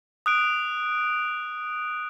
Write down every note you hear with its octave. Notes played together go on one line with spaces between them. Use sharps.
D#6 F#6 D7